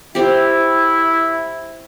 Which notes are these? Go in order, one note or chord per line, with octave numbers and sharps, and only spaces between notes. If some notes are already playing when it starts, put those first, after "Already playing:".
C4 E4 G4